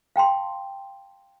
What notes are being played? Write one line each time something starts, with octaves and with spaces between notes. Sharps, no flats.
F5 G5 A5 C6